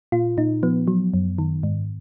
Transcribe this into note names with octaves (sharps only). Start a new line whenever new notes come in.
A#2 F4
A#2 D#4
F3 B3
F#3
F#2
D#3
G#2